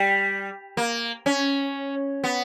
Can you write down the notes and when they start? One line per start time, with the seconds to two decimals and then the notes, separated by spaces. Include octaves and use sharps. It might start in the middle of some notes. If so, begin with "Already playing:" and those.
Already playing: G3
0.77 A#3
1.26 C#4
2.24 B3